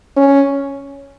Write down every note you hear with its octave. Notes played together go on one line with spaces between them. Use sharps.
C#4